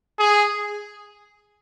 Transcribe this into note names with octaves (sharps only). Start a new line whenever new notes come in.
G#4